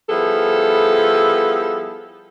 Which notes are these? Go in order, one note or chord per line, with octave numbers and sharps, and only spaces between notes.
F3 G3 B3 E4 G#4 A4